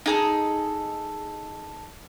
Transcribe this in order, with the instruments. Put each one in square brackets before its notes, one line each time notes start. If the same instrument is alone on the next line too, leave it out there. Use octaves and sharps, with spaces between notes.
[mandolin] D#4 G#4 A4